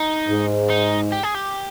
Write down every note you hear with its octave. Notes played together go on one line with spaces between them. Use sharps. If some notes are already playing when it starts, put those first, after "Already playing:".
Already playing: D#4
G#2
D#4
G4
G#4
G4